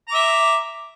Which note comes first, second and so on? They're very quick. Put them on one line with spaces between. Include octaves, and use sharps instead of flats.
A#5 D6 E5